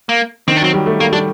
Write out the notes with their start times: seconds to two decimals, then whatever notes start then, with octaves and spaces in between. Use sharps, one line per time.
0.09 A#3
0.48 D#3 C4
0.57 D4
0.61 F#3 C4
0.74 G3
0.86 A3
1.00 A3 A#3
1.12 G3 D4